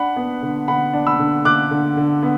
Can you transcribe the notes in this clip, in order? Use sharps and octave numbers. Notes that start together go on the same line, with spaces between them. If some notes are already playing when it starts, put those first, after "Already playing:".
Already playing: D4 F#5 B5
B3
D3
D3 F#5 B5
D4
B5 E6
D3
D3 D6 F#6
D3
D3
B3